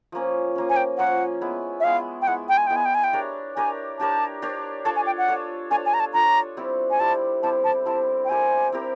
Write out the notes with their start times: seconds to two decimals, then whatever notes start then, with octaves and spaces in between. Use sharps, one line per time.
0.12 F3 A#3 C#4
0.55 F3 A#3 C#4
0.69 G#5
0.76 G5
0.98 F3 A#3 C#4 F#5
1.41 G#3 B3 E4
1.80 E5
1.84 G#3 B3 E4 F5
2.22 G5
2.27 G#3 B3 E4 F#5
2.49 G5
2.57 G#5
2.67 G#3 B3 E4 G5
2.76 G#5
2.85 G5
2.95 G#5
3.04 G5
3.13 D4 G4 A#4 C#5
3.56 D4 G4 A#4 C#5 G#5
3.99 D4 G4 A#4 C#5 A5
4.42 D4 G4 A#4 C#5
4.85 D4 F4 A4 C#5 A5
4.96 G#5
5.06 G5
5.18 F#5
5.28 D4 F4 A4 C#5
5.71 D4 F4 A4 C#5 G#5
5.86 G#5
5.94 A#5
6.00 A5
6.14 D4 F4 A4 C#5 A#5
6.57 G3 C4 E4 G4
6.91 G#5
7.00 G3 C4 E4 G4 A5
7.43 G3 C4 E4 G4 A5
7.64 A5
7.85 G3 C4 E4 G4 A5
8.25 G5
8.29 C4 E4 G4 A#4 G#5
8.72 C4 E4 G4 A#4